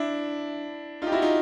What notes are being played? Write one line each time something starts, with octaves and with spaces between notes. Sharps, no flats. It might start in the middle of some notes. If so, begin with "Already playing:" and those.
Already playing: D4 E4
D#4 F4
G4
E4 F#4
D#4 F4